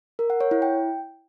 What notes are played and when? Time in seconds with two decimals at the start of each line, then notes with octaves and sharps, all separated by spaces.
0.19 A#4
0.30 F#5
0.41 C#5
0.51 E4
0.62 G5